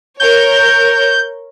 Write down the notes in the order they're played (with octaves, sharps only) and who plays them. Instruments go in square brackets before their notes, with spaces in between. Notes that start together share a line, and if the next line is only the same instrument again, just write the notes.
[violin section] A#4 C#5 [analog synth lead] G6